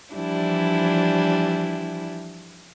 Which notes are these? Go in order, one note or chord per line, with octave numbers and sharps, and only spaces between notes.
E3 F3 G3 D4 E4